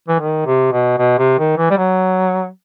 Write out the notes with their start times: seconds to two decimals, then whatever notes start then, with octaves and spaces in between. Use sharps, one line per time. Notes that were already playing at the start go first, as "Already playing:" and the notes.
0.08 E3
0.20 D#3
0.46 C3
0.72 B2
0.98 B2
1.18 C3
1.39 D#3
1.58 E3
1.70 G3
1.78 F#3